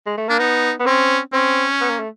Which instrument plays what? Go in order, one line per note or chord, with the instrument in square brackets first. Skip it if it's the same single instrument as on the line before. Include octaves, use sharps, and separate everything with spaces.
[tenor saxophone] G#3
A3
[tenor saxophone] A#3 [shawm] D4
[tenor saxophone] B3 [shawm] D#4
[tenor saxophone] B3
[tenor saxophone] C4 [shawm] C#4
[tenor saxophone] C4 [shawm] C#4
[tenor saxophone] B3
A#3
A3